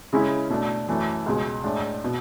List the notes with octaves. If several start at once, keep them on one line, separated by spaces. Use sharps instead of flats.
C#3 G#3 C#4 E4
B2 A3 D4
F#2 E3 A3
C#2 B2 G#3
A2 G#3 D4
B2